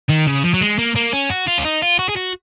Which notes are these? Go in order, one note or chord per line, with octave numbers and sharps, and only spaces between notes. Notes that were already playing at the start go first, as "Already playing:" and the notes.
D#3
C#3
F3
F#3
G#3
A#3
A#3
C#4
F#4
F4
C#4
D#4
F4
F#4
G#4
F#4